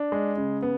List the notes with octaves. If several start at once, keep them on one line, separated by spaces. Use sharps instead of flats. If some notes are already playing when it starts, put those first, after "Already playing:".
Already playing: D4
G#3
C#3
B3